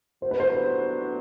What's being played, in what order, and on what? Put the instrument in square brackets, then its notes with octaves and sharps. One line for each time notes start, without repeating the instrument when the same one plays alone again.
[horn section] A2 F#3 B3 D4 [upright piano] C5
[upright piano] B4
C5